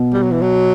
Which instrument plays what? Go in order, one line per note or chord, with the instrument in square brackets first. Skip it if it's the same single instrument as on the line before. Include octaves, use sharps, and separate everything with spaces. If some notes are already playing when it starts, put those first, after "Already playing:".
Already playing: [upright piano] B2
[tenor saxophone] G3
F#3
E3
F#3